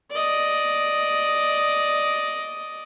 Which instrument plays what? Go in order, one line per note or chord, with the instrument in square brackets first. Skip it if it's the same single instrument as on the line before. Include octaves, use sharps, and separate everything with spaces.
[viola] D5 D#5